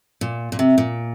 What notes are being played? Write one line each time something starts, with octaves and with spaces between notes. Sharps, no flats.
A#2
A#2
C3
A#2